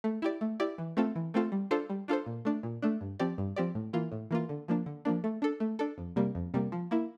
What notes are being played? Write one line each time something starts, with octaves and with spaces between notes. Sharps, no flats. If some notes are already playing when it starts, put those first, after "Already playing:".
A3
E4 G4 D5
A3
E4 G4 D5
E3
A3 C4 F4 A4
E3
A3 C4 F4 A4
G3
D4 F4 A4 C5
G3
D4 F4 A4 C5
A#2
A3 D4
A#2
A3 D4
G2
F3 C4 G4 D5
G2
F3 C4 G4 D5
A2
E3 A#3 F4
A2
E3 A#3 F4
D3
F3 A#3 D4
D3
F3 A#3 D4
A3
D4 A4
A3
D4 A4
F2
C3 G3 A#3
F2
C3 G3 A#3
F3
A#3 E4